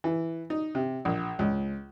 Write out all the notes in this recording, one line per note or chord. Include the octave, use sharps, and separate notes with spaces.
E3
D#4
C3
A#1
C#2